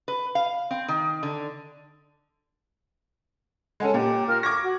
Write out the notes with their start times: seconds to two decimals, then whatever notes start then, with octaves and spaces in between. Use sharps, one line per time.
0.08 B4
0.35 F5
0.71 C4
0.88 D#3
1.23 D3
3.80 G#3 C#4 A4 F#5 G#5
3.94 A#2 G4
4.28 F4 A#4 F6
4.43 C#6 D6 G#6 A#6
4.62 F#4